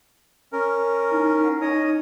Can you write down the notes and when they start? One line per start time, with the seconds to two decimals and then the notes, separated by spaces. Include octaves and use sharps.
0.53 C#4 A#4
1.11 D#4 E4
1.44 B4 F#5
1.62 D#4 C#5 D#5 D#6